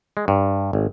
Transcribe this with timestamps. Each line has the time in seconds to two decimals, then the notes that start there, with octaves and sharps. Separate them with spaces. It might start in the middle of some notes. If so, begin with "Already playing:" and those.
0.17 G#3
0.28 G2
0.73 G#1